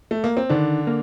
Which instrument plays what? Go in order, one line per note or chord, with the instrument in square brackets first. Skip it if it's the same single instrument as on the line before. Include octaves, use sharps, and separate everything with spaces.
[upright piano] A3
A#3
C4
[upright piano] D3 D4 [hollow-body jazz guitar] D#3
[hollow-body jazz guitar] A#3